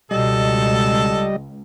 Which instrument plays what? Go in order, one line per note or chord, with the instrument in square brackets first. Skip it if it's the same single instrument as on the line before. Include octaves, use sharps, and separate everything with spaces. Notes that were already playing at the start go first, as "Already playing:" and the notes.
[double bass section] C#2 [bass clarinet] B2 [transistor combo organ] G3 D#5 [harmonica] A4